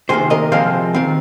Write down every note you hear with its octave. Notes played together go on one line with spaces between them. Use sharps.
C3 D#3 A#3 G#4 C5
A#4 D#5
C3 F3 G#3 C4 C5 F5
D#3 C4